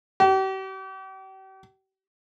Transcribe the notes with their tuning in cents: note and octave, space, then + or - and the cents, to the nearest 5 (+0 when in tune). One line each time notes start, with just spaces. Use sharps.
G4 -40